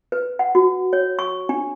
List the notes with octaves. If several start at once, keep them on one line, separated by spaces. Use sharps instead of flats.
B4
F#5
F#4
C#5
C#6
D4